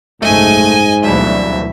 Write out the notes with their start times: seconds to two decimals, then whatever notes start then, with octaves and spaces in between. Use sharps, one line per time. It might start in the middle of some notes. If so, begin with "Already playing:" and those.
0.22 F#1 B1 G#2 A3 D#5 G#5
1.04 D2 G2 B2 E3 F#3 E5